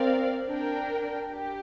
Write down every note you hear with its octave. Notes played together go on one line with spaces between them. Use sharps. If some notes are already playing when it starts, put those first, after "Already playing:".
Already playing: C4 A#4 D5 F5
D4 A#4 G5
G4